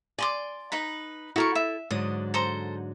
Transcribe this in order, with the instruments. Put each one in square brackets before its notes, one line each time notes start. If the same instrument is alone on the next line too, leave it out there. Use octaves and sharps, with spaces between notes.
[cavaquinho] D5 C6 D6 [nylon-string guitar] G#5
[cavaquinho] D#4 B4 B5
[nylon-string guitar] E4 A4 [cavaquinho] F#4 A#4 C#6
[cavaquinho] E5
[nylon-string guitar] G#2 D3 F#3 [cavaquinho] D#6
[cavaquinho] A4 C5 A#5